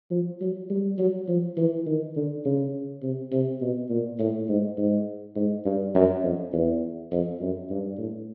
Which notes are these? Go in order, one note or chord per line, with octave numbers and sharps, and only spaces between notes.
F3
F#3
G3
F#3
F3
E3
D#3
D3
C#3
C3
C3
B2
A#2
A2
G#2
G#2
G#2
G2
F#2
F2
E2
F2
F#2
G2
A2